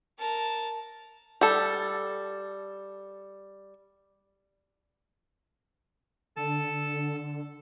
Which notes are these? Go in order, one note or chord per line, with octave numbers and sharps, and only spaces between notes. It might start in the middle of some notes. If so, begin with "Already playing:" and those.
A#4 A5
G3 A4
D3 A4 A5